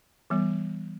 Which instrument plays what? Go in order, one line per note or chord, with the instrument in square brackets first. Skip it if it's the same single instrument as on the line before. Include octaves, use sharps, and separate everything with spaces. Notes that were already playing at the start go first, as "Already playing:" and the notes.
[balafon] E3 G3 B3